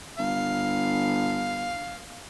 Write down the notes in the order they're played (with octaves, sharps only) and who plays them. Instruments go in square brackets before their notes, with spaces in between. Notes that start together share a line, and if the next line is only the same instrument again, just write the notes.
[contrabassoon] G1 [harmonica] F5